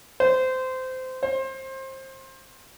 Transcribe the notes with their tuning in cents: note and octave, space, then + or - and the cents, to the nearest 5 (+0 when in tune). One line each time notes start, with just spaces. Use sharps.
C5 -20
C5 +25